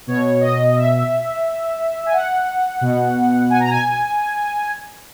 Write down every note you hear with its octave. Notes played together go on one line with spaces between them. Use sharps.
B2 C#5
D#5
E5
G#5
F#5
B2
G#5
A#5
G#5